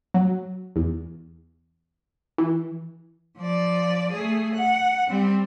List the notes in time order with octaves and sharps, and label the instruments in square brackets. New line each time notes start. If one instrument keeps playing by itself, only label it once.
[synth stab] F#3
E2
E3
[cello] F3 D5
A3 G#4
F#5
G3 C4